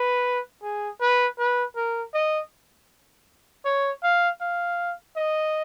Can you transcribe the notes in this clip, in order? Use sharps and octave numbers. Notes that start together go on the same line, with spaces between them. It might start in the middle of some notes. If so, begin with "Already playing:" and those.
Already playing: B4
G#4
B4
B4
A#4
D#5
C#5
F5
F5
D#5